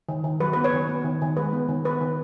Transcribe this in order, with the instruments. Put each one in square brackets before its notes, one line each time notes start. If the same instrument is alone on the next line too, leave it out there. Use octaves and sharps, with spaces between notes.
[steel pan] D#3
D#3
F#3 B4
B3 B4
C#5
D#3
B3
D#3
D#3
G#3 B4
B3
D#3
B3 B4
D#3